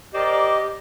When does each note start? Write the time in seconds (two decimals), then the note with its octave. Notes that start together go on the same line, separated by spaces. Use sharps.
0.14 G4 A#4 C5 D5 D#5